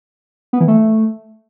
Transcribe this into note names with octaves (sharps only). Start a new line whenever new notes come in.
B3
E3
A3